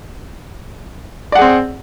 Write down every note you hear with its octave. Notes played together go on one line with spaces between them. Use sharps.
C4 G#4 D5 F#5